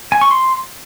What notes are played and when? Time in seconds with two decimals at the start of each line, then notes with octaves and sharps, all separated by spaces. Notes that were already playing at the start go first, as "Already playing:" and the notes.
0.12 G#5
0.21 C#6
0.31 C6